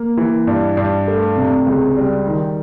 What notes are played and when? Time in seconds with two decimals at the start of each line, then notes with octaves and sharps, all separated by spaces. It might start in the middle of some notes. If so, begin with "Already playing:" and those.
Already playing: A#3
0.17 E3
0.47 G2
0.77 G2
1.08 A3
1.36 C3
1.67 C#2
1.97 G3
2.27 D#3